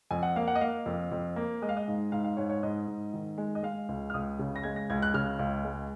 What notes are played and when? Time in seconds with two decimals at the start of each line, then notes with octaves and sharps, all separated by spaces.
0.11 F2 G#5
0.23 F#5
0.36 A#3 F5
0.48 F#5
0.55 D#5
0.61 A#3 F5
0.86 F2
1.11 F2
1.36 A#3
1.62 G#3 D#5
1.69 F5
1.77 D#5
1.88 G#2
2.12 G#2 F5
2.24 F5
2.37 G#2 C#5
2.49 C#5
2.63 G#2 D#5
2.88 G#2
3.14 D#3
3.38 G#3
3.55 D#5
3.63 G#3 F5
3.89 C#2
4.10 F6
4.14 C#2 D#6
4.39 C#3
4.56 A#6
4.64 G#3 G#6
4.76 A#6
4.90 C#2 G#6
5.02 F#6
5.14 C#3 F6
5.39 C#2
5.64 G#3